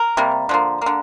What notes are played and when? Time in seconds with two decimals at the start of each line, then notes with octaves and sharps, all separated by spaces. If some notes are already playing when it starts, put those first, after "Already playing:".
Already playing: A#4
0.17 C3 G3 A#3
0.49 D3 F3 A#3
0.82 D3 A#3